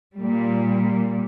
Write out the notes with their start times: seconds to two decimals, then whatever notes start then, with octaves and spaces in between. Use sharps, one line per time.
0.18 A#2 G3